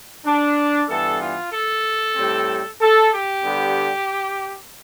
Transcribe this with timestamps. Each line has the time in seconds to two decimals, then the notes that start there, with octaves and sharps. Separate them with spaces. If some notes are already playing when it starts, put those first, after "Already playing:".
0.25 D4
0.89 G2 E3 B3 A4
1.20 F4
1.52 A4
2.16 A2 G3 C4
2.80 A4
3.12 G4
3.44 D3 G3 B3